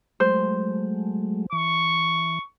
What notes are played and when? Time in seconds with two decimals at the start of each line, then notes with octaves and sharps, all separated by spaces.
0.20 F#3 G#3 A3 C5
1.52 E3 C#6